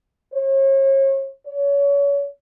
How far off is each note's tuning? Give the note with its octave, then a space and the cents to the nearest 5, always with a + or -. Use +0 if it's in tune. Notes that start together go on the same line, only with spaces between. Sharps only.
C#5 -40
C#5 +30